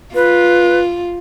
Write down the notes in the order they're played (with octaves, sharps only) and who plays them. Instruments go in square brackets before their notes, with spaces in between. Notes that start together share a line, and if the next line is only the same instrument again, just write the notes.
[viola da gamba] F4 [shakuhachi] B4